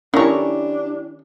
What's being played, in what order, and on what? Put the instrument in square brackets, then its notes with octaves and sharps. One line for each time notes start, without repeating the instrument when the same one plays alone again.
[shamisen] D#3 A3 [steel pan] C#4 A#5 C#6 [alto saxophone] D4 [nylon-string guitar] E4 G4